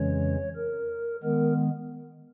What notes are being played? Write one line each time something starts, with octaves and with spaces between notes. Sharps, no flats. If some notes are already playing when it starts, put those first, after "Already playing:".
Already playing: F2 C#3 E3 G#3 C#4 C#5
A#4
D#3 G#3 B3 A#4